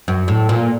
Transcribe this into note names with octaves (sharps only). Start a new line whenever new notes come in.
F#2
A2
A#2